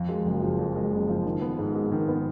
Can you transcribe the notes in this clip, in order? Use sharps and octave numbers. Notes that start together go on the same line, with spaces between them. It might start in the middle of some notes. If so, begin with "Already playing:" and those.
Already playing: F2
G#3
F#1
F3
F2
G#3
F#1
F3
D#3
B3
G#2
G#3
D#3
B3